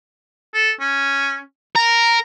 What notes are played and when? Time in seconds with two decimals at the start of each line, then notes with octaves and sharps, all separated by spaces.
0.54 A4
0.80 C#4
1.76 A#4 A#5